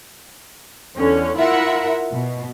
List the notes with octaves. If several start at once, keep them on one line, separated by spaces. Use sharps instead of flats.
E2 D3 C#4
E4 F4 A#4 E5 F#5
B2